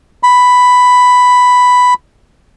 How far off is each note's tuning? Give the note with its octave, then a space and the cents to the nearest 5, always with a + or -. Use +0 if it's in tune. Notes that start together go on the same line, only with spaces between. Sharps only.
B5 +5